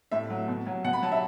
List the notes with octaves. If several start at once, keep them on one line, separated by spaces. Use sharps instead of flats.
A2 E5
F#3
B2
F#3
B2 F#5
B5
F#3 A5
E5